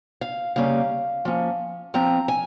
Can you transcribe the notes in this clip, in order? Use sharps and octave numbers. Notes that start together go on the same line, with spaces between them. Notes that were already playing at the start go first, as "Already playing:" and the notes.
F5
C#3 G3 A#3 C#4 F5
F3 A#3 C#4
F3 C4 A#5
G#5